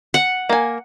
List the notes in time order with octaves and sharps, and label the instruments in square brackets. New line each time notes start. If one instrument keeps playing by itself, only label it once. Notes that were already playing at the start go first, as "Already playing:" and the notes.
[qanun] F#5
[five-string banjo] A#3 G#5